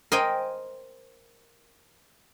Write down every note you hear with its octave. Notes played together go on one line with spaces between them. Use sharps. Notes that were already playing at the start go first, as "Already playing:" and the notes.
A#4 C5 D#5 G5 G#5